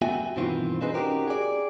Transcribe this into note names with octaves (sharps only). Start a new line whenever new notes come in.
B3 F#4 E5 G5 G#5
G2 B2 D#3 E3 C4 F4
C4 D4 D#4 G#4 B4 C5
C#4 D#4 F#4 G4 A#4
G#4 D5